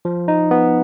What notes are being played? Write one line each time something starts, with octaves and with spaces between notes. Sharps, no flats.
F3
D#4
B3